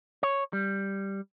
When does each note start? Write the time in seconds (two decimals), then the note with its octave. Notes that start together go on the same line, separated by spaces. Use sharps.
0.23 C#5
0.53 G3